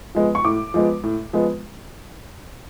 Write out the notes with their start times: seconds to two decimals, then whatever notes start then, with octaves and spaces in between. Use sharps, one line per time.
0.15 F3 G#3 B3
0.35 C#6
0.45 A2 D6
0.74 F3 G#3 B3
1.03 A2
1.33 F3 G#3 B3